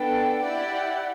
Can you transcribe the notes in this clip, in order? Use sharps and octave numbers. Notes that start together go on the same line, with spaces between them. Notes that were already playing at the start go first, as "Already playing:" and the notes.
Already playing: B3 D4 A4 G5
E4 G4 D5 F#5